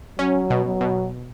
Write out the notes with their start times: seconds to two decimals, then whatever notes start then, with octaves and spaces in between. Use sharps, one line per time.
0.18 F#3 C#4
0.50 B2
0.65 F#3
0.81 B2